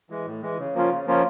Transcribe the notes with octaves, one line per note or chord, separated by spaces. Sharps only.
E3 G#3
A2
E3 G#3
C#3
F3 A#3 C#4 F4
C#3
F3 A#3 C#4 F4